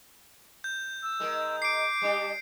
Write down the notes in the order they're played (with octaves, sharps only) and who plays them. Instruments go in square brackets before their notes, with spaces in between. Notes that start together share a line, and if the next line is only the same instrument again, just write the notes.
[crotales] G6
[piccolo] E6
[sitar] D#3 G#3 A#4
[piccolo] D6 [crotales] C7 D7
[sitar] G3 D4 G4